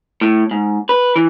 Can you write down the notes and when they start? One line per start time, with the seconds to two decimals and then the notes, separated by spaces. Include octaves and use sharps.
0.21 A2
0.51 G#2
0.89 B4
1.16 E3